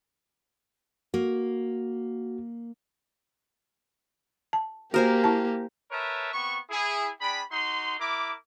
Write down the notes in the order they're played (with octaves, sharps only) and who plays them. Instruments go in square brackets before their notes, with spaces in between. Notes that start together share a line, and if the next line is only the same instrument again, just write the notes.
[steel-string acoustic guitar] A#3 [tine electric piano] F#4
[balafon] A5
[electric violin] A#3 G4 [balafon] F#4 [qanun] A#4 C5 G#5
[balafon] E4 A5
[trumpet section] A#4 B4 C#5 E5 A5
B3 C4 C#6
E4 G#4
D4 G#4 G5 B5
D#4 F#4 C6
E4 A#4 D6